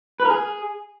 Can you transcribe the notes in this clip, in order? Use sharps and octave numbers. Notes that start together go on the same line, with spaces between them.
B4
A#4
G#4